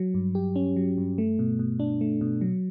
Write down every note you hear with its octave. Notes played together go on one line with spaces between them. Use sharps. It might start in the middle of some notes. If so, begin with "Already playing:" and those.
Already playing: F#3
G2
G4
C#4
F#3
G2
A3
B2
B2
D4
A3
B2
F#3